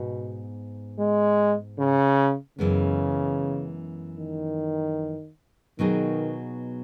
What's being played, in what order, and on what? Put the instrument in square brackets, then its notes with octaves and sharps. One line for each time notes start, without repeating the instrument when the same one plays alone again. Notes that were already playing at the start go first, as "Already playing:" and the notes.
Already playing: [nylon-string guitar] G#2 B3 [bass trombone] B2
[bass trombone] G#3
C#3
[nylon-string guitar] F#2 E3 G#3 B3 [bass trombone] C#3
[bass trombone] D#3
[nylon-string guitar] B2 F#3 B3 D#4 G#4 [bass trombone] D#3